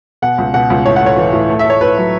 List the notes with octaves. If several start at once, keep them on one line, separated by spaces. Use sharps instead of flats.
B2 F#5
C#2
B2 F#5
C#2
A2 C#5
F#5
A3
C#5
E3
A2
A3
E5
A3
C#5
A2 B4
F#3